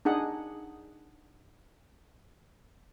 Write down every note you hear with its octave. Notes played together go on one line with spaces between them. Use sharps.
D4 D#4 G#4 F#5